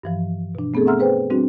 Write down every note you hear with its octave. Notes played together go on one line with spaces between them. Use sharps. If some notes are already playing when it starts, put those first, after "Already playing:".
G2 E3 F3
B2 D4
A3 B3 C4 G#4 A4
E5 F#5 A#5 C6 E6 F6
G#4 B4 C5 G5
G3 C4 D4 F#4